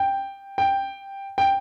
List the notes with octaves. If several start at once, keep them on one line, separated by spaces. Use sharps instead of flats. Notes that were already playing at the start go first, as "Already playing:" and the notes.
Already playing: G5
G5
G5